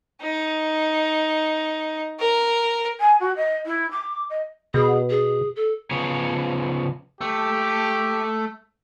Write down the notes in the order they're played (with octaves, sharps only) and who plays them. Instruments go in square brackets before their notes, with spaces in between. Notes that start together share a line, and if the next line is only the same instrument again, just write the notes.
[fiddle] D#4
A#4
[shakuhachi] G#5
F#4
D#5
E4
D6
D#5
[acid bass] B2 [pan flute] G#4
[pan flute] G#4
A4
[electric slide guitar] C#3 F3 B3 G#4 C#5
[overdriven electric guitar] A3 [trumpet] G4